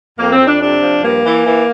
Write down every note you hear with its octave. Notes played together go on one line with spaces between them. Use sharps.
F2 A#3
C4
F2
D4
C3 D4
F3
G2 A#3
E3
E3